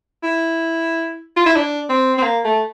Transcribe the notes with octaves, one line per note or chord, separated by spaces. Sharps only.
E4
F4
E4
D4
C4
C4
A#3
A3